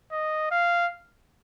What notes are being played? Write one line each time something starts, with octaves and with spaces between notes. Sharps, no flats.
D#5
F5